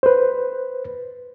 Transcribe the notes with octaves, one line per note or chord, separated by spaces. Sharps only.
B4 C5